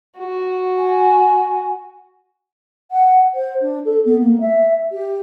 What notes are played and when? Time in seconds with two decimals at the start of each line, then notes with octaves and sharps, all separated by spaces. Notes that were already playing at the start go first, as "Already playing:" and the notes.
0.18 F#4
0.77 G#5
2.91 F#5
3.34 C5
3.61 D4
3.85 A4
4.05 B3
4.20 A#3
4.40 E5
4.92 G4